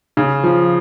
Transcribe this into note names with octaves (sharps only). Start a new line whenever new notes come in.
C#3
F3